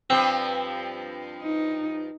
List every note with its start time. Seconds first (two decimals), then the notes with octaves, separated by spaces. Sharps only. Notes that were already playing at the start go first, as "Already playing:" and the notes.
0.10 G2 F3 C4
1.42 D#4